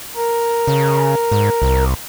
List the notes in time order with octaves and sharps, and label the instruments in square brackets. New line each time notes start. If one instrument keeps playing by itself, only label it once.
[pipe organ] A#4
[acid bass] C#3
G#2
C2